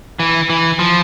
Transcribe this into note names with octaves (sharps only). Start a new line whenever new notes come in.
E3
E3
F3